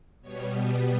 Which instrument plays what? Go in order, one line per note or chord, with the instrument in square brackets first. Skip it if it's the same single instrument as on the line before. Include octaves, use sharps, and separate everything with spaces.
[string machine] B2 G3 B3 C#5